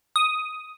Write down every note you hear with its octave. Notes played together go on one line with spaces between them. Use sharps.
D#6